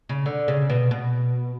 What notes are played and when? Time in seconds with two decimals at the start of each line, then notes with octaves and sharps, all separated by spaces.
0.09 C#3
0.26 D3
0.48 C#3
0.70 B2
0.91 B2